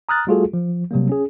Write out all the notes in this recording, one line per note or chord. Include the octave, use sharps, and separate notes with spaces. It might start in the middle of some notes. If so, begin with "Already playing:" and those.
A#5 D#6 F6 F#6 A6
G3 A3 F4 F#4 G#4 A4
F3
C3 F#3 G3 A#3
C#4 G#4